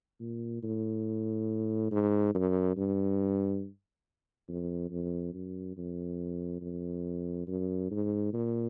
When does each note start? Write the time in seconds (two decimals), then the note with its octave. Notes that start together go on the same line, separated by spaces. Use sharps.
0.20 A#2
0.63 A2
1.91 G#2
2.35 F#2
2.77 G2
4.48 F2
4.91 F2
5.33 F#2
5.77 F2
6.62 F2
7.47 F#2
7.91 G#2
8.33 A#2